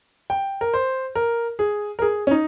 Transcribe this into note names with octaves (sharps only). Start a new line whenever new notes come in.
G5
A#4
C5
A#4
G#4
A#4
G#4
C#4
D#4